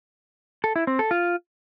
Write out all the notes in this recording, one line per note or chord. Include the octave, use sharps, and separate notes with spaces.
A4
E4
C4
A4
F4